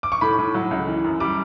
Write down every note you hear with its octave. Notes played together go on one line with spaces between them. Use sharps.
D6
C#6
A2 B5
A2
F#3
C#2
E3
F#2
G3 D6